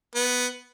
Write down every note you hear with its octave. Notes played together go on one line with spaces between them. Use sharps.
B3